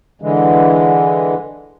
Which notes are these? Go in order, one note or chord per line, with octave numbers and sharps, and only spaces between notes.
D3 E3 G#3